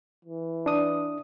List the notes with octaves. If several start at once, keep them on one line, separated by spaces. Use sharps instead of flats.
E3
D4 D#6